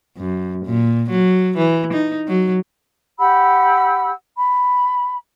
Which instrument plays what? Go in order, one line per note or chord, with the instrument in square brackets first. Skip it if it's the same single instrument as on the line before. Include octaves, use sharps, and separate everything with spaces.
[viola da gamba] F#2
A#2
F#3
E3
D#4
F#3
[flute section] G4 F#5 B5 E6
B5